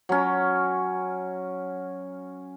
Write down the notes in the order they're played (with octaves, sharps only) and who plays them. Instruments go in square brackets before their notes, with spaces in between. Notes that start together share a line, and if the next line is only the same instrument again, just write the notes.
[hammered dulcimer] F#3 C#4